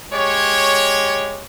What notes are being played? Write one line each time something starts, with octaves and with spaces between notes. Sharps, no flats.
G#3 G4 C#5